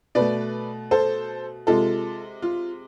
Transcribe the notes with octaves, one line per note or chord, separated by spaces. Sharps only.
B2 A3 B4 D5
A4 C5
C3 G#3 F4 A4
F4